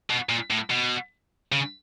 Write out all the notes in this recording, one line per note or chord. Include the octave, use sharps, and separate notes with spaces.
B2
A#2
A2
B2
C#3